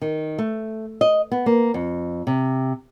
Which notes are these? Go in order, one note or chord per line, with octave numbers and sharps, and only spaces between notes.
D#3
A3
D#5
B3
A#3
F2
C3